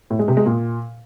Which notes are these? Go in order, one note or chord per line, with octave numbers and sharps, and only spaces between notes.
A2
G#3
C3
G#3
A#2